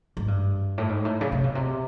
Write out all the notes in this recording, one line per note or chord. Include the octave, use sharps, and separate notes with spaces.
G#2
G2
A2
G#2
A2
C#3
C3
B2
C3